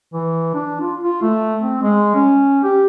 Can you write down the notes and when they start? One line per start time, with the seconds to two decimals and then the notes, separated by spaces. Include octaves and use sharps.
0.14 E3
0.54 D4
0.81 F4
1.03 F4
1.22 A3
1.62 C4
1.82 G#3
2.15 C#4
2.64 G4